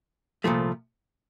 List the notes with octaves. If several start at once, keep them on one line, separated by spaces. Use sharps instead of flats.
C2 A#2 F3 A3